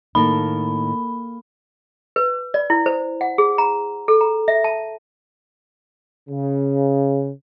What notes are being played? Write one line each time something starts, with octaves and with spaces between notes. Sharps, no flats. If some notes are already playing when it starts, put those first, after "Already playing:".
A2 D#3 A#3 D#4 A4 A#4 B5
B4
D5
E4
C5
F#5
G#4
A#5
A4
A#5
E5
A5
C#3